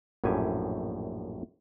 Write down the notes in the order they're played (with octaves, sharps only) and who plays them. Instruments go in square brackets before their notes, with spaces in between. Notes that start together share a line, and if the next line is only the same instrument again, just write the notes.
[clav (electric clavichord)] A#1 F#2 A2 G4 G#5